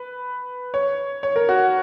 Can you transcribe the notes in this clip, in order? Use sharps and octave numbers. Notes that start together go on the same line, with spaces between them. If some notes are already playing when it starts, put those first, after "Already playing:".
Already playing: B4
C#5
C#5
A#4
F#4